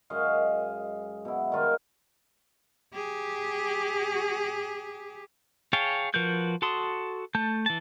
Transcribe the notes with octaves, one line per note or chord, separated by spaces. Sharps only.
F#2 G#3 D#5 F5
B2 E4
D#3 G3 F4 A#4
G4 G#4
G#4 C#5 F5 G5 A5
F3 F#4 A#4 B4 G6
F#4 A4 A5 C6 D#6
A3 A5 G6
E3 A5